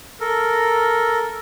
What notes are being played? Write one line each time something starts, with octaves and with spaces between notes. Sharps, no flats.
A4 A#4